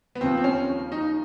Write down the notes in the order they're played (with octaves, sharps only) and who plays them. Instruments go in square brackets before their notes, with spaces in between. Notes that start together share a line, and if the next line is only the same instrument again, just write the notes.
[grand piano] B3
D#2 C#3 F3 C4
C4
C#4
D#4